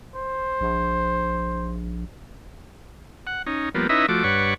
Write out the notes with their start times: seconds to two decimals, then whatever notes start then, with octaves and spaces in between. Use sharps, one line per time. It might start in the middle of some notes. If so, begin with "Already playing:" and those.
0.15 C5
0.61 A#1
3.27 F#5
3.47 C#4 D#4
3.75 F3 G3 A#3 B3
3.89 C#4 D#4 E4 B4 D#5 E5
4.08 F3 A3 F#4 D6
4.24 G2 B4 C#5 D5 F#5 C#6